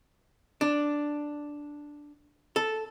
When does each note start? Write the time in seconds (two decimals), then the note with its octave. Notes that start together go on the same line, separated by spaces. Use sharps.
0.61 D4
2.56 A4